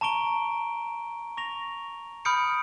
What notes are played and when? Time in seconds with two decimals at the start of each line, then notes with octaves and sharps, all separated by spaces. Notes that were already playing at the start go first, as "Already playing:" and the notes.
0.01 A5 A#5 C#6 D7 G7
1.37 C#6 A#6 F7
2.25 B5 D#6 F6 G6 C#7 D7